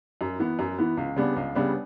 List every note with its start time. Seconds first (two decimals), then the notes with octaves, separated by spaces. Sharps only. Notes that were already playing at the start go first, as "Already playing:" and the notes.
0.21 F#2
0.39 E3 B3
0.59 F#2
0.78 E3 B3
0.97 C#2
1.16 C#3 G3 B3 D4
1.36 C#2
1.55 C#3 G3 B3 D4